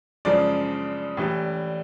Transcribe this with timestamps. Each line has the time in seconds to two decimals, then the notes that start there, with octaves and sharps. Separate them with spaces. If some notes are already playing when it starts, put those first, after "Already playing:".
0.25 F#2 C#3 F3 G#3 D5
1.17 A2 E3 G3